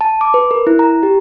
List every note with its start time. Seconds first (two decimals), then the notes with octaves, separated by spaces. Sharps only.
0.01 A5
0.21 D6
0.34 B4
0.51 A#4
0.67 E4
0.79 A#5
1.03 G4